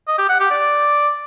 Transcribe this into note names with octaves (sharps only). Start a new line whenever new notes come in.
D#5
G4
F#5
G4
D5